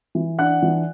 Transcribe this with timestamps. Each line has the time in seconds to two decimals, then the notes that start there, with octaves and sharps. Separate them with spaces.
0.15 E3
0.39 D4 F#5 F#6
0.62 E3